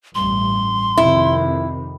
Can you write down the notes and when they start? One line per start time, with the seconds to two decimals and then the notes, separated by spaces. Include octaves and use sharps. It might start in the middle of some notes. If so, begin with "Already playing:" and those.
0.15 A1 G2 C6
0.97 F2 C3 D#3 E4